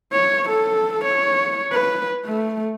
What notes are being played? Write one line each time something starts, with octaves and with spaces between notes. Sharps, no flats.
C#5
A4
C#5
B4
A3